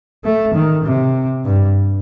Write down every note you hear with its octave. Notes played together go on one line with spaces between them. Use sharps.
A3
D#3
C3
G2